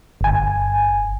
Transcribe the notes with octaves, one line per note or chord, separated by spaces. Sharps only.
G1 G#5